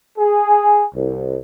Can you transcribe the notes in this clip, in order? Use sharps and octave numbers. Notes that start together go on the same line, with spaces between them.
G#4
C2